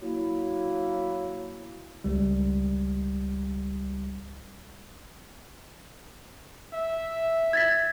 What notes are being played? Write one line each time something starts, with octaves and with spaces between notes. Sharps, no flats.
F#3 A#3 E4
C#2 G3
E5
G#6 A6 B6